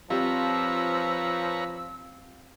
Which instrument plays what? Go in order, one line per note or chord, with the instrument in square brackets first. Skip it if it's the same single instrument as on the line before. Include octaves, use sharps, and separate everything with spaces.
[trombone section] F3 [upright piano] G3 C4 F4 [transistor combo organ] B4 C#5 A#5 [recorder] E6